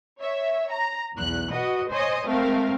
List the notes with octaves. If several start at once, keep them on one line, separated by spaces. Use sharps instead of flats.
C#5 E5
A#5
B1 E2 F#6
F#4 B4 D#5
C5 C#5 D#5 G#5
G#3 A3 C4 A#4 F5